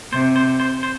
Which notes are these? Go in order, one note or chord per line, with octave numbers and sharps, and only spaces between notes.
C3 C5
C5
C5
C5